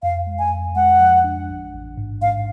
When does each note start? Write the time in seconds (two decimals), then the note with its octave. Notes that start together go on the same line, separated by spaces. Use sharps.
0.03 F2 F5
0.27 G#3
0.39 G#5
0.51 F2
0.76 G#3 F#5
1.00 F3
1.24 D4
1.48 A1
1.73 A1
1.97 G#2
2.21 G#2 F5